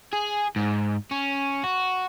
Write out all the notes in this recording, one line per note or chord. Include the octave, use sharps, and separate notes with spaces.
G#4
G#2
C#4
F#4